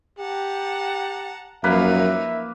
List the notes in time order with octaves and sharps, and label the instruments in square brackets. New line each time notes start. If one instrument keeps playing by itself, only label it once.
[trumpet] G4 [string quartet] F#5 A5 A#5
[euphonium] F#2 [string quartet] F3 D#4 [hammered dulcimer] A#3 B4 [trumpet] E5